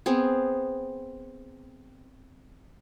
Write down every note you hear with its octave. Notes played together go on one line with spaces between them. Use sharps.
B3 C4 G#4